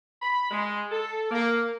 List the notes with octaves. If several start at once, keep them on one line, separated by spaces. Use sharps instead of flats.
B5
G#3
A4
A#3